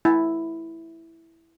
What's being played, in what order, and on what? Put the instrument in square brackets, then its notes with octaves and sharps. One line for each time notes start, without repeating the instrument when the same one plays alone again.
[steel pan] E4